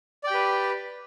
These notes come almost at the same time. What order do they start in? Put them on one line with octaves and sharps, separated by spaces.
D5 G5 G4 B4